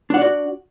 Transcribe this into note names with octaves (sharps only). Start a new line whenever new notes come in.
D4 F#4 D5 F#5